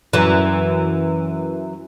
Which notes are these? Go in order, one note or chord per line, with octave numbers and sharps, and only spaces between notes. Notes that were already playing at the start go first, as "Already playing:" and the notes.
F#2 E3